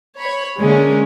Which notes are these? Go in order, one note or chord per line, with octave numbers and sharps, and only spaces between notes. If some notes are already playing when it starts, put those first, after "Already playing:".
C#5 B5
D3 G#3 A#3 C#4